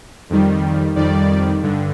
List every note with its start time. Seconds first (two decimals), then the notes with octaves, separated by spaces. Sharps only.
0.30 F2 D#3 G3
0.95 F2 D#3 G3 D5
1.63 G2 D3